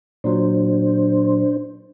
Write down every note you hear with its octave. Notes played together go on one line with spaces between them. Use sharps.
A#2 F#3 D4 C5